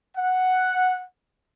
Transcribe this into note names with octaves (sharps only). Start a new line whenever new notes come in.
F#5